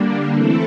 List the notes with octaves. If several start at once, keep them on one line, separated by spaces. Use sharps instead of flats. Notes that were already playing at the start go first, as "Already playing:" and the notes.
Already playing: D3 G3 A#3 D4
E3 A3 C4 E4 A4